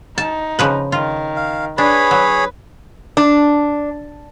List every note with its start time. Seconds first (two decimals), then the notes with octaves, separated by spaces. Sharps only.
0.18 D#4 A5
0.59 C#3 F3 B4
0.92 D#3 F4
1.36 F5
1.78 D4 G#4 B4 C#5 B5
2.11 F#3
3.17 D4